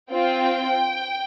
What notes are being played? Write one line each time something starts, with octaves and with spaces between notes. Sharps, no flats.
C4 F4 G5